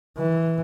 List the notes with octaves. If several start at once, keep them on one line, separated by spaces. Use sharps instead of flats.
E3